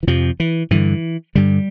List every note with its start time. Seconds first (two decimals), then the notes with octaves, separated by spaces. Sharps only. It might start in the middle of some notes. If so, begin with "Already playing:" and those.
0.03 E3
0.07 F2 C3 F3
0.40 E3
0.71 G2 D3 E3
1.35 G2 D3 G3